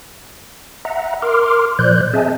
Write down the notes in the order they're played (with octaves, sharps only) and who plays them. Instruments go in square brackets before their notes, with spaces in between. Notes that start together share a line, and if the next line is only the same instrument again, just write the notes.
[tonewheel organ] E5 F#5 A#5
A#4 C6 D6 F6
A#2 F3 C5 D5 F#6 G6
C4 G#4 D#5 E5 G#5 A5